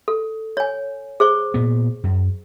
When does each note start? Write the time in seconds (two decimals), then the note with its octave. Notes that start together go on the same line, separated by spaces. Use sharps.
0.08 A4
0.57 C#5 G#5
1.20 G#4 C5 C#6
1.54 A#2 B3
2.03 F#2